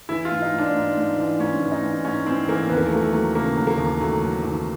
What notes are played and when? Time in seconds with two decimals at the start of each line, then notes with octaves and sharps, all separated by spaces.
0.09 E3 E4
0.25 F4
0.31 G#2
0.42 D#4
0.53 G#2
0.58 D4
0.75 G#2
0.97 G#2
1.18 E3
1.40 G#2 C#4
1.61 E3
1.72 D#4
1.82 G#2
2.05 G#2 C#4
2.26 E3 C4
2.48 E3 A#3
2.69 D#2 B3
2.77 A#3
2.86 A3
2.91 F#3 A#3
3.02 A3
3.13 F#3
3.35 C#3 A#3
3.57 F#3
3.67 A#3
3.78 D#2
4.00 F#3 A3
4.22 F#3
4.44 D#2